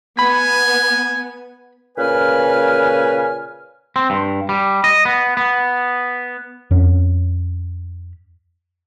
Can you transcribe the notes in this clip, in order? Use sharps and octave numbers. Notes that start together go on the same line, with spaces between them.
B3 G#5 B5
A#2 C#3 B4 G#5 F6
C4
G2
G3
D#5
B3
B3
F2 C#4